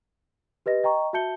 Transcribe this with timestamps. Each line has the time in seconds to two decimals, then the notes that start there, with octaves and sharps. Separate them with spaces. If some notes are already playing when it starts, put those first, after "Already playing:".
0.66 G4 B4 D#5 A#6
0.84 D#5 G5 A#5 C#6
1.13 F#4 E5 A5 G6 C#7 G7